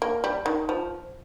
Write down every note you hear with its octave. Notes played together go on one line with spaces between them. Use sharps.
A#3
G3
D#3
F3